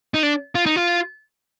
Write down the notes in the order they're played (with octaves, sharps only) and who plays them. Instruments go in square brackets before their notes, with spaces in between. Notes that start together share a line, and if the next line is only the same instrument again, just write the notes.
[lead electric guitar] D#4
D4
F4
D#4
F4